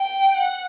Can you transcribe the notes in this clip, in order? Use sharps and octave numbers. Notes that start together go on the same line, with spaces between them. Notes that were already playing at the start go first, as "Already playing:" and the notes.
Already playing: G5
F#5